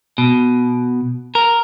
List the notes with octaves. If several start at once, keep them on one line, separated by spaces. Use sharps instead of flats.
B2
A#4